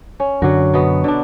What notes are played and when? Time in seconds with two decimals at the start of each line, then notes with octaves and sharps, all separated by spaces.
0.20 C#4
0.42 F#2 D3 F#3 F#4
0.74 B2 B3
1.04 D3 D4